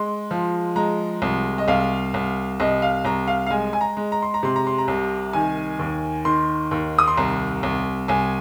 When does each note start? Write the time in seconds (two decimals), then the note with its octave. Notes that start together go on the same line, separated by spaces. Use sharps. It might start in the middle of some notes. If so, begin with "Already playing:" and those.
Already playing: G#3 C6
0.31 F3
0.76 G#3 A#5
1.22 C2
1.58 D#5
1.68 C2 F5
2.14 C2
2.60 C2 D#5
2.82 F5
3.05 C2 A#5
3.28 F5
3.46 F5
3.50 G#3 G#5
3.73 G#5
3.81 A#5
3.97 G#3
4.12 A#5
4.22 C6
4.34 A#5
4.43 C3 C6
4.56 A#5
4.67 C6
4.78 A#5
4.88 C2
5.33 D#3 G#5
5.79 D#2
6.25 D#3 C6
6.71 D#2
6.99 D#6
7.08 C6
7.17 C2 A#5
7.63 C2
8.08 C2 G#5